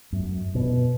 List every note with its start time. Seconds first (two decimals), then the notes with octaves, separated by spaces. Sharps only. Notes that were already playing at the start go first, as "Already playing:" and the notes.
0.12 F#2
0.55 B2